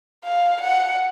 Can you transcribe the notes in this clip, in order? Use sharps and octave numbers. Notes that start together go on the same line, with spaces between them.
F5
F#5